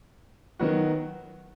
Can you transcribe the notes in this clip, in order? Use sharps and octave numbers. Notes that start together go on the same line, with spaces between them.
D#3 F#3 B3 F#4